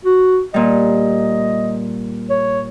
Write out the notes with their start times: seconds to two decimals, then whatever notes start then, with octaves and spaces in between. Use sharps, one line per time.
0.05 F#4
0.54 A#2 G3 D#5
2.30 C#5